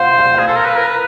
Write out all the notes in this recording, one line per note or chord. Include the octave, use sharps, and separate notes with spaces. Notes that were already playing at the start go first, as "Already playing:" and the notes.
Already playing: C5 F5 F#5
F5
G#4 F5
A4
A#4
B4
A#4
B4